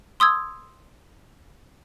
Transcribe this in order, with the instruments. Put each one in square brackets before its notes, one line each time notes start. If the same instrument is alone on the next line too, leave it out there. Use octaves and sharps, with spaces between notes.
[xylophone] C6 D#6 E6 G#6